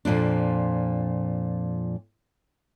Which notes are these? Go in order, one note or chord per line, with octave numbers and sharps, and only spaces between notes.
F2 A#2 F3 D4